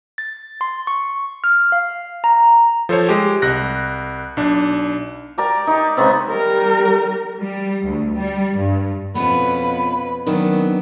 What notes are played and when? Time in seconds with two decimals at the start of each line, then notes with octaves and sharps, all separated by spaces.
0.18 A6
0.61 C6
0.87 C#6
1.44 F6
1.72 F5
2.24 A#5
2.89 F3 A4 C5 C#5
3.09 G#3 G4
3.42 C2 F#6 A#6
4.37 B1 D4
5.38 G4 A#4 D5
5.67 D#4 G4
5.97 C#3 G#3 B3 C4
6.30 G3 A#4
7.40 G3
7.87 D2
8.17 G3
8.57 G2
9.15 F2 B2 B3 C#4 F4 B4 B5
10.26 D#3 F#3 B3 C4 D4